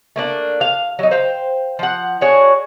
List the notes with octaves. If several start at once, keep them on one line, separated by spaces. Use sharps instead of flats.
A3 A#3 D4
F5
F#3 D#4
C5 F5 G5
F3 F#5
D4 F#4 G#4 C#5